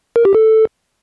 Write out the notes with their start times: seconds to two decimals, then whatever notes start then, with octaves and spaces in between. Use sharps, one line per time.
0.16 A#4
0.25 G4
0.35 A4